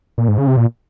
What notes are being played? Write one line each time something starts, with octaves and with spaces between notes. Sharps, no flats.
A#2
G#2
C#3
C3
A#2